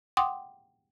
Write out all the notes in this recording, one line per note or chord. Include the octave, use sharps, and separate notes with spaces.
F#5 G5 C6 D6 D#6